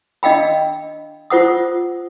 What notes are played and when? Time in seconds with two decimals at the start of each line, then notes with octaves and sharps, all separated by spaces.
0.23 D4 D#5 F5 G5 B5
1.30 F4 C5 F#5 D#6